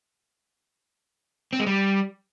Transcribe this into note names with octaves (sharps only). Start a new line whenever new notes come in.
C4
G#3
G3